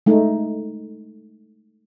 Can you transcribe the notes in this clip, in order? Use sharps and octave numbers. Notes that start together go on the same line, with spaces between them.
G#3 A3 D#4